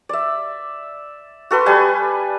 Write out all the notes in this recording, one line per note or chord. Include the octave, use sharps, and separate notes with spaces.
D5 E5
F#4 A4 B4 C6
G3 B4 G#5 A5